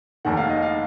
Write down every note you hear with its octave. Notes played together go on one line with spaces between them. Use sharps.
F1 D#2 D#3 F#5
F5
D#5
F5